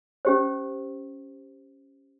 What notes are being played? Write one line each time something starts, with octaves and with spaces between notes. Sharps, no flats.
C#4 G4 C5